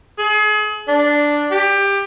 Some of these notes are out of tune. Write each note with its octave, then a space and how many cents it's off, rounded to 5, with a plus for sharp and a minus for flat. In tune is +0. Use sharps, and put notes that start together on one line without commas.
G#4 +35
D4 +0
G4 +20